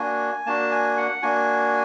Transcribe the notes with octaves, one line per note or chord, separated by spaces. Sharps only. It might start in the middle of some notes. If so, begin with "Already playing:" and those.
Already playing: A#3 D4 F#4 G#5
A#3 D4 F#4 A5
G#5
F#5
A#3 D4 F#4 G#5